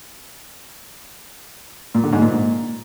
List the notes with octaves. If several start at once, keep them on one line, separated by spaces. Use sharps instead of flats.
A#2
D3
G#2
A#2